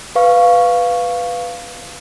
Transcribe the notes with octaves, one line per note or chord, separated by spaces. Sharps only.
B4 F5 C#6